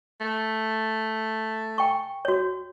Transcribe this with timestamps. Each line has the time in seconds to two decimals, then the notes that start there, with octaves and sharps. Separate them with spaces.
0.21 A3
1.78 G5 G#5 C#6
2.25 F#4 C#5